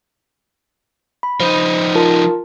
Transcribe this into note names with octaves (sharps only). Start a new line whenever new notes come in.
B5
F3 D#4 C5
F4 A#4 A5